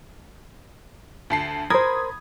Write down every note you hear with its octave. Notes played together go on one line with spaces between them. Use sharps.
D2 A5 C7
A#4 C5 B5 D#6 G#6